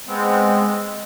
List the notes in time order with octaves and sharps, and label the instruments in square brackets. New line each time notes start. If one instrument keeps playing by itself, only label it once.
[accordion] G#3 B3 C4